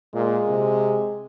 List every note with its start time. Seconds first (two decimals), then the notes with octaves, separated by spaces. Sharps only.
0.14 A#2 G#3
0.48 C3